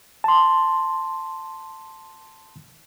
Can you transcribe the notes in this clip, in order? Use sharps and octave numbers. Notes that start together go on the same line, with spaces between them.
A5 C6